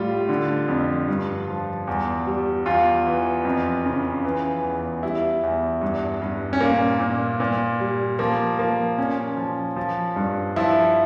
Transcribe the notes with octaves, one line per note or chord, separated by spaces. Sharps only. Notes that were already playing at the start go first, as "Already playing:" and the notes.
Already playing: A2 G3 F4
D3
F2
G2
F3
E2
G3
E2 F4
E3
F2
C#3
E3
E2
G3 E4
E2
G2
G2
C#4
A#2 A#3
A#2
A#2
G3
F3 A#3
F3 A#3
A#2 C#4
F3
F3
G2
F3 E4